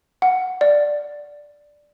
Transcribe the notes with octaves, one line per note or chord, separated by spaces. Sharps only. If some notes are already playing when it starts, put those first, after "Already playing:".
F#5
D5